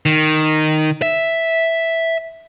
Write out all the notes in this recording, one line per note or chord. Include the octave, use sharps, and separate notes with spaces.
D#3
E5